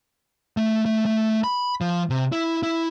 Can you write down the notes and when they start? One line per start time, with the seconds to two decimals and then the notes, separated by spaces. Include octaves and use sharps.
0.57 A3
0.86 A3
1.05 A3
1.44 B5
1.81 F3
2.10 C3
2.32 E4
2.63 E4